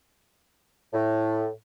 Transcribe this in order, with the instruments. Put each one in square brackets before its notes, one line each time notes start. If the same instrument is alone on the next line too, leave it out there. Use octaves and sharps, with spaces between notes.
[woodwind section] A2